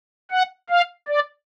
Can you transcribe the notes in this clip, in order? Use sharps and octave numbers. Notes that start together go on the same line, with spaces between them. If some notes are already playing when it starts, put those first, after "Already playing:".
F#5
F5
D5